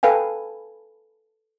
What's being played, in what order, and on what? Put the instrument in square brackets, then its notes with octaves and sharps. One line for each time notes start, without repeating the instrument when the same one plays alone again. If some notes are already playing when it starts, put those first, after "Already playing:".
[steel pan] A4 B4 F5 G5 G#5